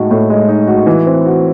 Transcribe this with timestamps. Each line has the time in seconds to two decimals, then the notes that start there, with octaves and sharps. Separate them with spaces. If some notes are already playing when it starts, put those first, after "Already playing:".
Already playing: A2 G#3 D#4 F#4
0.11 A2
0.30 G#3
0.48 D#4
0.67 F#4
0.86 E3
1.07 C4
1.26 F#4